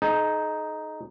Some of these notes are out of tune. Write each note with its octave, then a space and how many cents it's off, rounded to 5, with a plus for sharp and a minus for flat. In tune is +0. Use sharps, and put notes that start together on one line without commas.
D#4 +0 G#4 +45 C5 -5